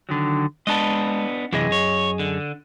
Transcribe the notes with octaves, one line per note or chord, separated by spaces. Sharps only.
D3 D#3 F#3
G#3 B3 D4 D#5 A5
F#2 C3 E3 G#4 D#5
C#5
D3